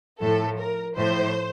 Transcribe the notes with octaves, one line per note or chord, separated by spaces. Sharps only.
A2 F3 A4
A#4
A2 F3 C5